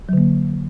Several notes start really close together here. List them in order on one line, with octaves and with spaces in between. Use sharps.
F#3 D3 A#3